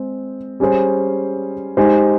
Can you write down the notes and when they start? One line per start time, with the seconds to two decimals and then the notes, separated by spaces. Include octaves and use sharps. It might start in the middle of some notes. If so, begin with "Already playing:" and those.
Already playing: G#3 C4
0.60 G3 C#4 G#4 C5
1.77 G#3 D#4 G4 C5